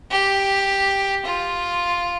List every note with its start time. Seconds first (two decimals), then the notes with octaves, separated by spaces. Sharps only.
0.11 G4
1.25 F4